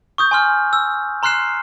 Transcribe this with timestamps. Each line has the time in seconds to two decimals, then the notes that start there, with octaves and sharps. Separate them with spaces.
0.18 C#6 D#6 G6
0.31 G#5 C6 F6
0.73 E6
1.23 A#5 C6 F6 F#6 C7 E7